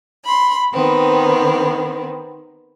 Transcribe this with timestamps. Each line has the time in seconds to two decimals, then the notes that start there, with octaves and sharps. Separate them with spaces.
0.24 B5 C6
0.73 D#3 B3 C4